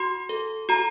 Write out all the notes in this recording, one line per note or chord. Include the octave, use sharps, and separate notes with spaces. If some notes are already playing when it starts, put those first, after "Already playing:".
Already playing: F#4 C6
A4
F#4 A#5